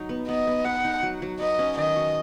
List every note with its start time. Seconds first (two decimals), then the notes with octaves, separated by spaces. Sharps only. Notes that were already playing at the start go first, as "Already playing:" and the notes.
Already playing: F#3 D#4
0.09 B3
0.28 B3 D#5
0.47 B3
0.65 B4 F#5
0.85 D#4
1.03 F#3
1.22 F#3
1.40 B4 D#5
1.59 C#4
1.77 D#3 D#5
1.96 F#4